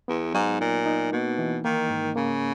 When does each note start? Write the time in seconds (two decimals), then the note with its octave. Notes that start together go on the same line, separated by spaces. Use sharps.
0.08 E2 B3
0.34 G#2 F#3
0.60 A#2 D#4
0.86 D#4
1.12 B2 A#3
1.39 E3
1.64 D#3 A#3
1.90 G#2
2.16 C#3 A#3